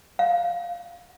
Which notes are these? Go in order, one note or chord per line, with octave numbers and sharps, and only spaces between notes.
F5